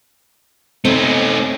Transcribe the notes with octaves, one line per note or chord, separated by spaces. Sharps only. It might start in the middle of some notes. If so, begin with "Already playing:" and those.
A3 C4 D#4 C#5